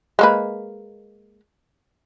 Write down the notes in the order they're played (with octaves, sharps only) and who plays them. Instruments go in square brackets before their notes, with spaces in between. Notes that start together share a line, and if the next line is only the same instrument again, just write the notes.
[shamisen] G#3 A#3 B4